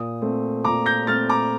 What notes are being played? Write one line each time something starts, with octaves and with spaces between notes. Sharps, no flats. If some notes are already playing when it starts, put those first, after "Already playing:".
Already playing: A#2 D#6
A3 C4
A#2 A#5 D6
G6 A#6
A3 C4 F6 A6
A#5 D6